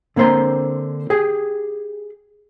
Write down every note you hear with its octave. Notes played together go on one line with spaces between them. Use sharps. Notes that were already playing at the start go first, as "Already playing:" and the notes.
D3 A#3 C4 C5 A#5 C6
G4 G#4